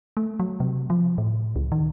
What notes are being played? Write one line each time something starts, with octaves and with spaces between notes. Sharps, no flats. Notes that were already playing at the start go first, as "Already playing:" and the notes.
A3
F#3
C3
F3
A2
C#2
D#3